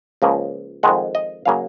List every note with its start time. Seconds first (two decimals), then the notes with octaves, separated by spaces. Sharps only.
0.22 C#2 C#3 F3 A#3
0.83 F2 D#3 G#3 F#5
1.15 D#5
1.46 C#3 F#3 A#3 F5